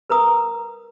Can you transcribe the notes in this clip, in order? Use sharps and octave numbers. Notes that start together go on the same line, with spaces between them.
A#4 B4 A#5 D#6